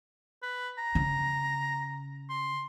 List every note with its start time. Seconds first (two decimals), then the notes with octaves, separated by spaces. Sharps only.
0.43 B4
0.78 A#5
0.95 C#3
2.30 C6